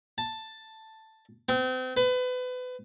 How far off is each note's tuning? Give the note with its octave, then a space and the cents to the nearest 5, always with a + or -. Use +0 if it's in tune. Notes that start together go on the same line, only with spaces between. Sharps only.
A5 +5
C4 -35
B4 +30